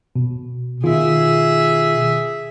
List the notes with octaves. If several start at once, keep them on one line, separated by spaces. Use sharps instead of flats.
B2
B2 D#3 F4 G#4 E5